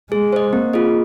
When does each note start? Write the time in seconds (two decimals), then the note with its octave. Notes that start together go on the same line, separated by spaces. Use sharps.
0.11 G#3 G#4
0.33 C5 D#5
0.53 A#3 C4
0.73 F4 G#4 D#5